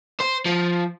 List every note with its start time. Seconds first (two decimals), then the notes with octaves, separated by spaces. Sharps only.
0.20 C5
0.45 F3